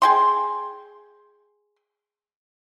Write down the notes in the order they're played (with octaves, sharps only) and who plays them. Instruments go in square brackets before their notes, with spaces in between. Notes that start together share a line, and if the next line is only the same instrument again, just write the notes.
[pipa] G#4 G5 C6